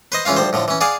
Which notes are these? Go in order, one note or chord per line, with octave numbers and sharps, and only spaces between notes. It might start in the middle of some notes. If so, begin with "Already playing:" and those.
B4 C5 D#5
C#2 E3 C#4 F4 F5
D2 F3 G3 C5
A2 D3 F3
E3 C#4
G#4 D5 F5 F#5 G#5